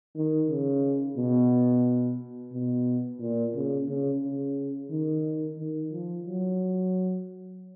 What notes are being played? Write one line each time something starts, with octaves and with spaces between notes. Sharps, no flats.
D#3
C#3
B2
B2
A#2
C#3
C#3
C#3
D#3
D#3
F3
F#3